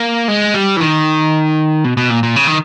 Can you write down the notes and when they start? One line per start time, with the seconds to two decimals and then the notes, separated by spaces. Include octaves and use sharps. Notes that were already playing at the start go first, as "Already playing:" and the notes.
Already playing: A#3
0.28 G#3
0.54 G3
0.77 E3
0.80 D#3
1.84 B2
1.97 B2
2.10 A#2
2.23 A#2
2.36 C#3
2.47 D#3